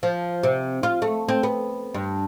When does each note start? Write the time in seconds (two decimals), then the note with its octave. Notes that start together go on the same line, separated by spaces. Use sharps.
0.03 F3
0.43 C3
0.83 F4
1.02 A3
1.29 C4
1.43 B3
1.94 G2